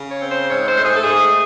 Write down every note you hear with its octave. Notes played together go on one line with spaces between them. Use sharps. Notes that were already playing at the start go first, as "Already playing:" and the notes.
Already playing: C#3
C#5
C4
C5
G#2 C#5
C5
A3
G#4
A4
G#2 G#4